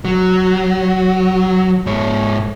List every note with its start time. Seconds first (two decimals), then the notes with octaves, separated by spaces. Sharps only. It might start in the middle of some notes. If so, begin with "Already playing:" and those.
0.05 F#3
1.86 G#2 C#5